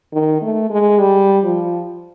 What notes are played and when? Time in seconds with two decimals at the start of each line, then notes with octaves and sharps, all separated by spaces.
0.13 D#3
0.42 A3
0.70 G#3
0.99 G3
1.44 F3